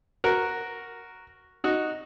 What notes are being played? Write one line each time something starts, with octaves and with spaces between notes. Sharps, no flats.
F#4 A#4
D#4 F#4